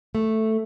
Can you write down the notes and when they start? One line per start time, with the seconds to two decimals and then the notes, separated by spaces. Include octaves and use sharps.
0.15 A3